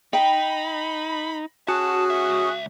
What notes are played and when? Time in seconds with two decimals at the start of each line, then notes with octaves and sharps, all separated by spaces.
0.13 D#4 G5 B5
1.68 C#4 F#4 G#4 A5
2.10 C#2 E5